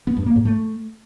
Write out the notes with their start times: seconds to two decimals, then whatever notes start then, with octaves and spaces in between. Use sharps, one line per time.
0.07 B3
0.17 G2
0.26 A#3
0.36 G#2
0.45 A3